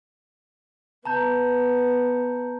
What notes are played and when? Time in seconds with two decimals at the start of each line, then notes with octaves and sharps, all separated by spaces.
1.05 B3 A5 A#5 G6